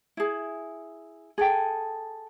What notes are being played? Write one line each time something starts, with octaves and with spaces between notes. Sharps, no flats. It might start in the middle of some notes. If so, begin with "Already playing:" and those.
E4 G#4
G#4 A4 G5